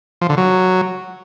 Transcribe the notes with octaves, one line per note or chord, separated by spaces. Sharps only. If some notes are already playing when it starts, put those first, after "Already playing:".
F3
D3
F#3